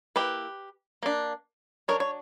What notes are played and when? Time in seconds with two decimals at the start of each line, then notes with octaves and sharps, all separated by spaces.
0.16 A#3 E4 G4 B4
1.03 A#3 D4
1.88 F#3 B3 D4 A#4 C#5
2.00 C#5